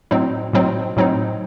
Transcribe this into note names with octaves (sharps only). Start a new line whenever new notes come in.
A2 F#3 C4 D#4
A2 F#3 C4 D#4
A2 F#3 C4 D#4